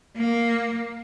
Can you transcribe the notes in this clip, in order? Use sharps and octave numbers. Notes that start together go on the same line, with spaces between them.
A#3